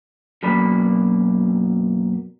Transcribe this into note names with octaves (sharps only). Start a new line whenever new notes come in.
F#2 B2 F#3 A#3 D5 B5